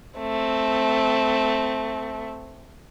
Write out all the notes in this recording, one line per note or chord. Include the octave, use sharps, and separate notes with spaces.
A3 C4